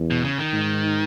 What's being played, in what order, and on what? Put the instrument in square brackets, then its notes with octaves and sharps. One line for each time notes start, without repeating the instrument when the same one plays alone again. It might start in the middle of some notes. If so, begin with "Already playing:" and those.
Already playing: [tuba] E2
[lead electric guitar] B2
C#3
D#3
[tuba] G#2